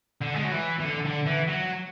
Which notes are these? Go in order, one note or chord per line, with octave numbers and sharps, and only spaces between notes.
D3
G#3
F#3
E3
E3
D3
D3
E3
F#3